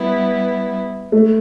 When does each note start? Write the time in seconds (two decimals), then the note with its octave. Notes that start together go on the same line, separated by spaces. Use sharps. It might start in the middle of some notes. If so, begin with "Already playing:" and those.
Already playing: G3 B3 E4 B4
1.12 A3